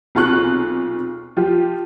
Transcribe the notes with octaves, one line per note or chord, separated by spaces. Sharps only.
B1 C3 F4 G#4 C#6 F#6
F3 F4 G4